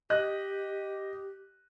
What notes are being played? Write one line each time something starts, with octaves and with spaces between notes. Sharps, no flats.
G4 D#5 F#6